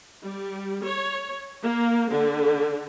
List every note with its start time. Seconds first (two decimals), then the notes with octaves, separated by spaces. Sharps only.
0.21 G3
0.83 C#5
1.63 A#3
2.10 D3